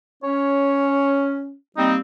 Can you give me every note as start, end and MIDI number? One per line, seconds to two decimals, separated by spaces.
0.23 1.56 61
0.23 1.43 73
1.77 1.97 55
1.77 1.97 58
1.77 1.97 60
1.77 1.93 63